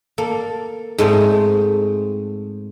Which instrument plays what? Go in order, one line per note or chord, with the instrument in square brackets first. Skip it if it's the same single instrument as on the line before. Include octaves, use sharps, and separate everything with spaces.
[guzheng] A#3 A4
G#2 G#3 A3 C4